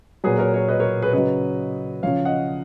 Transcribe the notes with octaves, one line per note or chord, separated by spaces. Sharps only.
A#2 F#3 G#4 B4
A#4 C#5
A#4 C#5
B4 D#5
A#4 C#5
G#4 B4
C#3 F#3 B4 D#5
C#3 F3 C#5 F5
D#5 F#5